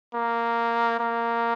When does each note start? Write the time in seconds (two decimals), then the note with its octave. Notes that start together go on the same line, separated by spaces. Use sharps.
0.14 A#3
0.99 A#3